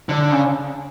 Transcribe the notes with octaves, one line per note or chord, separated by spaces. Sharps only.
D3
C#3